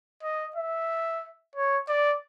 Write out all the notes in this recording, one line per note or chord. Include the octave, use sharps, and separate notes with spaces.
D#5
E5
C#5
D5